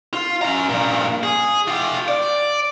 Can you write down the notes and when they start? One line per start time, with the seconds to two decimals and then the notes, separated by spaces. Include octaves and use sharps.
0.13 F4
0.42 C#4 A#5
0.69 G2 A#2
1.23 G#4
1.68 F4 G4
2.08 D5